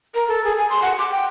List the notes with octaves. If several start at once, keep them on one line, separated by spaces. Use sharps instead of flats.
A#4
A4
G#4
G#5
C6
F#5
D6
G5